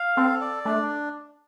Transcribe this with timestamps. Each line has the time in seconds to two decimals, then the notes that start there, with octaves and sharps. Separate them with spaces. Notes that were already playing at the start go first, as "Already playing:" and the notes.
Already playing: F5
0.17 C4 A4
0.41 D5
0.65 A3 D4